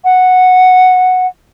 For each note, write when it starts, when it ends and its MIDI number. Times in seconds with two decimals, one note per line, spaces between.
0.04 1.27 78